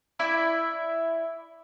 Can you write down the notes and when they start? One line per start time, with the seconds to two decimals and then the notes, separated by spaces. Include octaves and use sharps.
0.19 E4 D5 E5